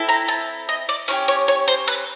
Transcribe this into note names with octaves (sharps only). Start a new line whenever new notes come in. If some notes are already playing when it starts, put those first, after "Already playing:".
Already playing: C4 E4 A4
A#5
A5
D#5
D5
C#4 E4 G4 C#5
C#5
C#5
C5
B4